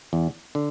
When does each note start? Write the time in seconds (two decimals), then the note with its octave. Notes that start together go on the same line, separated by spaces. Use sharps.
0.13 E2
0.55 D3